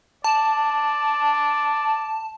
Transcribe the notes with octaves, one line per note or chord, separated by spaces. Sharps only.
D5 A5